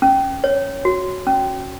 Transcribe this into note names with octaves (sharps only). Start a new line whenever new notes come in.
C#4
C#5
F#4
C#4